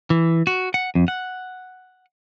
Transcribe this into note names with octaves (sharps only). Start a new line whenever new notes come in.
E3
F#4
F#5
F2
F#5